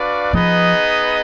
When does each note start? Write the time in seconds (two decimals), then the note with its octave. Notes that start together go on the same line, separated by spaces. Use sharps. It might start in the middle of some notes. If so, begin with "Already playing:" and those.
Already playing: D4 F#4 B4 D5 F5
0.33 F3 B3 D#4 G#4 B4 D#5